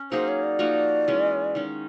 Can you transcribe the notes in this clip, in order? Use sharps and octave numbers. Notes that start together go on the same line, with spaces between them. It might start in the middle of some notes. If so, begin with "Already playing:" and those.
Already playing: C#4
F#3 A#3 D#4 G#4 C5
C#5
D5
F3 A#3 D#4 F#4
E3 G#3 C#4
D#3 G#3 C#4